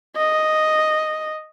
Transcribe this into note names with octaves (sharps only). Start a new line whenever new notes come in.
D#5